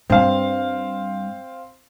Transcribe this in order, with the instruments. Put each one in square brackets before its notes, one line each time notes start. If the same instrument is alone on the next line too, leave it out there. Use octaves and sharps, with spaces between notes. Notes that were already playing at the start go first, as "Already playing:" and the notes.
[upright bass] G2 G3 [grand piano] C4 F5